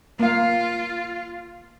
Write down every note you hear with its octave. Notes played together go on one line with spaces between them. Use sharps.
A#3 F4 F5